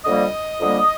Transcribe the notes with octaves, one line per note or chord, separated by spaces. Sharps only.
F2 D3 G3 A#3 D#5
F2 D3 G3 A#3